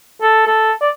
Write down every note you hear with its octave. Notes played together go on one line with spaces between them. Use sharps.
A4
A4
D5